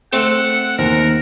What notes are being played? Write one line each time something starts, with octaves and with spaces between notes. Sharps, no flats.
A3 C4 A4 F#5
D#2 A#4 C5